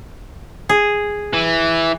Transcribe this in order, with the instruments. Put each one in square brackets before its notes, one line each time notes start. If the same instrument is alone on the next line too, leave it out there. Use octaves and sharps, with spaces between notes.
[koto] G#4
[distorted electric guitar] E3